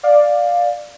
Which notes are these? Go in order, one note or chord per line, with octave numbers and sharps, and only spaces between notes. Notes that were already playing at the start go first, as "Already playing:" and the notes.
D5 F5